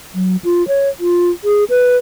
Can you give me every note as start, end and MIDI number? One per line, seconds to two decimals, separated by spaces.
0.15 0.36 54
0.44 0.66 65
0.68 0.89 73
1.00 1.30 65
1.44 1.64 68
1.70 1.96 71